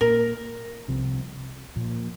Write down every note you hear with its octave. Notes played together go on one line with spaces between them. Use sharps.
A#2 A#3 A#4
C2 C3 F3 C4
A#2 F3 A#3